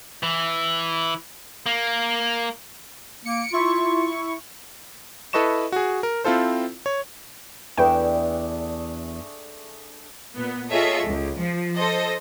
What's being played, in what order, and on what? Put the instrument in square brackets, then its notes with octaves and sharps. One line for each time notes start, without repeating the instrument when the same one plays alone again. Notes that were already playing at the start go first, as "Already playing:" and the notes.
[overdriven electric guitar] E3
A#3
[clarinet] A#3 [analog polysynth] C#7 D7
[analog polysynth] E4 C#6 [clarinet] F4
[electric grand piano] E4 A4 B4 D#5 C#6 E7
F#4 G#4
A#4
C4 E4 F4 A4 C5
C#5
[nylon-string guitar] E2 E4 [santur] A3 D4 G#4 [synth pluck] B4 G5
[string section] A#2 B3
F4 G#4 A4 C#5 D#5 E5
C#2
F3
A4 C5 D#5